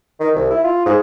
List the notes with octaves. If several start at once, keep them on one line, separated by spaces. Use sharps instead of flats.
D#3
C2
E4
F4
G#2